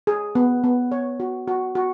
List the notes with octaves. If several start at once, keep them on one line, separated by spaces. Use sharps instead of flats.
G#4
B3
B3
C#5
F#4
F#4
F#4